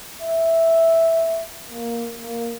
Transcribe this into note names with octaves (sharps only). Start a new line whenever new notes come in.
E5
A#3
A#3